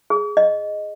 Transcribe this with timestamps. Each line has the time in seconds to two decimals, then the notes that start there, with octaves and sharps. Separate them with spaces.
0.10 G#4
0.37 D#5